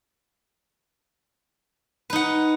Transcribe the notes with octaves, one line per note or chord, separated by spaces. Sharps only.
D#4 B4 F#5